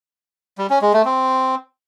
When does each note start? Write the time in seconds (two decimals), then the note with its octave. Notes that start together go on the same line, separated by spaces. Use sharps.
0.58 G3
0.70 C#4
0.82 G#3
0.93 A3
1.05 C4